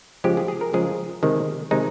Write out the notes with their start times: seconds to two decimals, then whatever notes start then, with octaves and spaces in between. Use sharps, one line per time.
0.24 C#3 F3 G#3 G4
0.37 G#4
0.48 G#4
0.61 A#4
0.73 C#3 F3 G#3 G#4
1.23 C3 D#3 G#3
1.71 C3 D#3 G#3 D#4